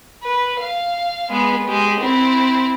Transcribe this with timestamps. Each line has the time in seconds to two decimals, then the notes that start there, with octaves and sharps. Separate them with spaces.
0.23 B4
0.60 F5
1.31 G#3 B3
1.67 G#3 G4
2.00 C4 E4